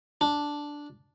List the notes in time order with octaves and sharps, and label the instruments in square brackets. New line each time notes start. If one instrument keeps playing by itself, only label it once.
[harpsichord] D4